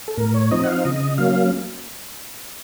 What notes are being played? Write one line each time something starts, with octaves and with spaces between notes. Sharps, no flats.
A4
A2 A#4
C#5
F3 C4 D#4 D#5
F#5
F5
C#3 D#5
F#3 A#3 C#4 F5